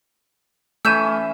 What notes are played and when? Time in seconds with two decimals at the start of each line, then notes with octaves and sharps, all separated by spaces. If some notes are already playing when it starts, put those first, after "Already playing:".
0.85 E3 A3 C#4 E6 G6 D#7 E7